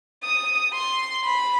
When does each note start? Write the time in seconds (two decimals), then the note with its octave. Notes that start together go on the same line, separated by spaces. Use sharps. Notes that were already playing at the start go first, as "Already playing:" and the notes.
0.24 D#6
0.74 C6
1.24 B5